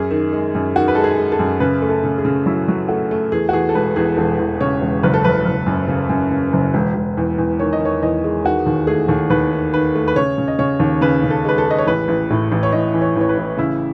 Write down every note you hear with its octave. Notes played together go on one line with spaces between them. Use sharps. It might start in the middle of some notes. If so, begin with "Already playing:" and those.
Already playing: F#2 G#4
D#3
G#3
F#2
D#3 F#4
B4
G#3 A4
G#4
G#3
A4
F#2
C#3 B4
A3
A4
C#3
G#4
C#3
F#3 E4
F#3
A3 F#4
A3
E2 G#4
F#4
E2 G#4
A4
E1 B4
E2 G#4
E1 A4
E2
C#3 C#5
E1
F#1 B4
A4
F#1 B4
F#1
F#2
C#3
F#2
C#3
F#1
E1
E1
E2
E2
D#3 C#5
D#5
D#3
C#5
E2 D#5
G#3
D#3 F#4
D#2
A3 G#4
D#2
D#2 B4
D#3
D#3 B4
A3
B4
C#3 C#5
C#3
D#5
C#3 C#5
D#2
C#3 B4
C#3
A4
G#3 B4
A4
G#3 D#5
C#5
A1 B4
A1
A2
A1
C#5
A1 D#5
E3
C#5
A1
C#5
B4
A1
C#3 E4